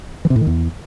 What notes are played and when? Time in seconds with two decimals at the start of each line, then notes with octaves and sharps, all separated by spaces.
0.25 E3
0.30 C3
0.36 A2
0.41 D#3
0.47 E2